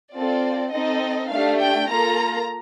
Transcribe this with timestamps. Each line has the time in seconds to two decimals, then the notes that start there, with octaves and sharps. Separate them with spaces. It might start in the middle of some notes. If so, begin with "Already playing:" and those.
0.15 C4 F4 A4 D5
0.72 C4 D#4 A4 D#5
1.31 A3 D4 G4 F5
1.60 G5
1.89 A#3 F4 A4 A#5